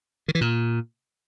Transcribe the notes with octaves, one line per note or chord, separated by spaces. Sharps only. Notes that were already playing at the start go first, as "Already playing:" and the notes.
D#3
E3
A#2